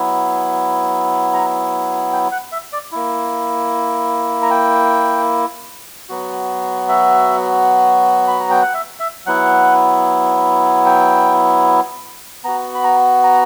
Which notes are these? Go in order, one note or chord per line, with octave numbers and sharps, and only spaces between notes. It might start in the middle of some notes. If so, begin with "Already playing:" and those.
Already playing: F#3 B3 E4
A#5
G5
F#5
E5
D5
A#3 E4
A#5
G5
F#3 B3 F#4
E5
B5
A#5
G5
F#5
E5
E5
F#3 B3 E4 F#5
G5
B3 F#4 A#5
B5
A#5
A#5